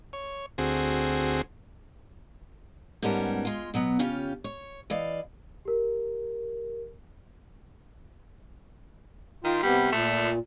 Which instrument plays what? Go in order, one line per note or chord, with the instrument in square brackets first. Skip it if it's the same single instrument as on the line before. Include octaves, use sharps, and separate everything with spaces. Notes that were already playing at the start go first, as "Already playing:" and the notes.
[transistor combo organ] C#5
D2 C4 F#4 G#4
[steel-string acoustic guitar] G#2 G3 B3 C#4 A#4 A5
G#3 F4
B2 F#3 B3
C#3 C#4 F4 G4
C#5
E3 D5 D#5 F5
[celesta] G4 A#4
[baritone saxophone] D#3 [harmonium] F4 G5
[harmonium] C3 B3 [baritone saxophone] G3
[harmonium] A#2 [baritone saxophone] A3